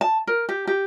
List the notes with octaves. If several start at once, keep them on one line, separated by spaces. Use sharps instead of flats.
A5
A#4
G4
G4